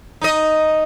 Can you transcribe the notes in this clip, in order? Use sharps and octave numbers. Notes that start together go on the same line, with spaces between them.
D#4 D#5